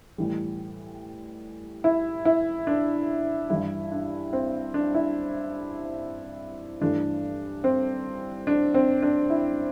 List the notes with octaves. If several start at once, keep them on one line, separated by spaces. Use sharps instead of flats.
A2 E3 G3
E4
E4
D4
G2 E3 G3 E4
D4
C4
D4
E4
G2 E3 A3 D4
C4
D4
C4
D4
E4